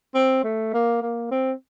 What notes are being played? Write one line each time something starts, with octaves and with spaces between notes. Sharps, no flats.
C4
A3
A#3
A#3
C4